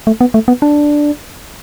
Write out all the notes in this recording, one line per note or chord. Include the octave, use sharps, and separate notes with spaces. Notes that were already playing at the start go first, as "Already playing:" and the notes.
A3
B3
A3
B3
D4